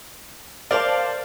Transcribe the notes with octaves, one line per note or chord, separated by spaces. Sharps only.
A#4 C5 D5 F5 A5